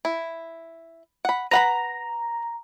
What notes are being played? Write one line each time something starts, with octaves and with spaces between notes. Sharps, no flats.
E4
F#5 B5
B4 F#5 A#5 B5